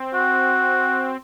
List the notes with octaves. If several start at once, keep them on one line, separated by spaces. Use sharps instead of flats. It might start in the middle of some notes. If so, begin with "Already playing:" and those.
Already playing: C4
F#4